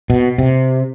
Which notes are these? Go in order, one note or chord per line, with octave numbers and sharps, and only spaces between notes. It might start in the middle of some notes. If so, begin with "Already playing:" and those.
B2
C3